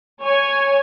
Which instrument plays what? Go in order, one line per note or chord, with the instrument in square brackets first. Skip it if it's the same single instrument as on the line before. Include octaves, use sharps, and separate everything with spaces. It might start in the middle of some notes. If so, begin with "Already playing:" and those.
[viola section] C#5 G#5